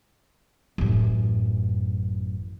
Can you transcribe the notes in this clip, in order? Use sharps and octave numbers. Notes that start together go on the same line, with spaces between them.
A1 F#2